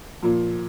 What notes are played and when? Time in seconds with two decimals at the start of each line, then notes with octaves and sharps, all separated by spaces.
0.22 A#2 F3